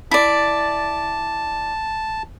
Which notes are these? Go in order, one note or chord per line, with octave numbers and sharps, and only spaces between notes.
E4 D5 A5